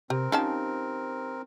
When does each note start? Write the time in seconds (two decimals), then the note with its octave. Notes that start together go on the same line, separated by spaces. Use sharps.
0.10 C3 C4 G4 A#4
0.32 F3 C#4 D#4 G4 G5 A5